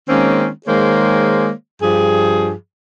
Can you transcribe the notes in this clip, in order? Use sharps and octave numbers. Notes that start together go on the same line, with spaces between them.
D#3 G#3 A#3 C4 C#4
D#3 G#3 A#3 G#4 C5 C#5
G2 F3 G#4